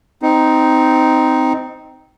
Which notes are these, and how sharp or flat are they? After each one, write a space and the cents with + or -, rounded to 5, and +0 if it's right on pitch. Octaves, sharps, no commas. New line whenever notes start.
C4 -15 D#4 +5